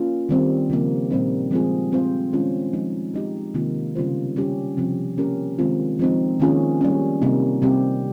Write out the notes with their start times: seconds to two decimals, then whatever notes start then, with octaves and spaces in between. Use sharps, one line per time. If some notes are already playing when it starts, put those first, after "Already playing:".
Already playing: A#3 C#4 F4
0.29 D#3 G3 C4
0.70 C#3 F3 A#3
1.11 A#2 G3 C4 D#4
1.51 F3 G#3 C4 F4 G#4
1.92 G3 C4 F4 C5 F5
2.32 D#3 G#3 C#4 F4
2.73 F3 G#3 D#4
3.14 G#3 D#4 G4
3.54 C3 D#3 A#3 F4
3.96 C#3 G3 C4 F4 C5
4.36 G3 C#4 G4
4.77 C3 F3 C4
5.17 A#3 C#4 G4 A#4
5.59 D#3 G#3 C4 F4
5.99 F3 G#3 C4 D#4
6.40 D#3 A#3 C#4 F4 G#4
6.81 G3 A#3 C#4
7.22 C3 G3 A#3 D#4
7.62 C3 G3 C4 G4